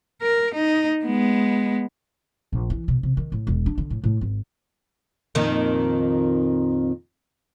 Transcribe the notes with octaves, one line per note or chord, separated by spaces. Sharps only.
A#4
D#4
G#3 B3
A#1
E3
B2
C3
D#3
A2
E1
D4
D3
A2
A2
G#1
F2 A#2 D#3